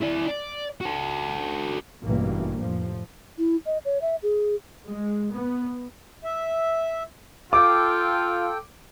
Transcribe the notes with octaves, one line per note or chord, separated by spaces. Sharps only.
E4 D5
D5
F#4 A4
A1 G2 B2 E3 A#3
F1 A2 F3
E4
D#5
C#5
E5
G#4
G#3
B3
E5
F4 A4 G5 D6